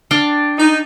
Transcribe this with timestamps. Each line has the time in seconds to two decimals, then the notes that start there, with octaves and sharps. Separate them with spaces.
0.11 D4 F5 G5
0.58 D#4